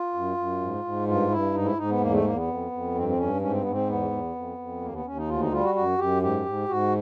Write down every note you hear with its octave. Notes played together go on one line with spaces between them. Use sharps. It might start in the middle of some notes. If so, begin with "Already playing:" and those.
Already playing: F4
F#2
F#2
G#2
G#2
G2 F4
G2 E4
G#2 D#4
E4
G#2 D#4
B3
E2 A#3
A3
E2 A#3
B3
F2
F2
G2 C4
C4
G2 C#4
G#2 C#4
C4
G#2 B3
C4
E2 B3
E2
F2
F2
D#2 A#3
B3
D#2 C#4
D#4
D2 F4
D#4
G3 F4
F#4
F#2 F#4
F#2 G4
G#2 G4
G#2
G#2 F#4